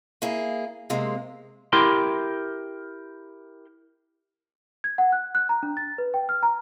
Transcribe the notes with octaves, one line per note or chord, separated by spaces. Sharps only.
A#3 E4 G#4
C3 G#3 A#3 C4
E4 G4 A#4 C6
G#6
F#5
F#6
F#6
A#5
D4
A6
B4
G5
F6
A#5